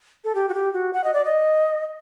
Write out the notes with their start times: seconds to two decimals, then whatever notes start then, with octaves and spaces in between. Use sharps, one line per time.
0.24 A4
0.35 G4
0.49 F#4
0.54 G4
0.73 F#4
0.93 F#5
1.04 D#5
1.14 D5
1.25 D#5